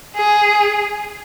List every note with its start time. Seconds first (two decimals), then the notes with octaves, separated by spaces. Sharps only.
0.16 G#4